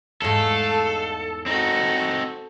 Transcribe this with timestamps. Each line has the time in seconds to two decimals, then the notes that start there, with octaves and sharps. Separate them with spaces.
0.22 E2 G#2 A3 A4 F5
1.46 C4 D#4 F#4 A4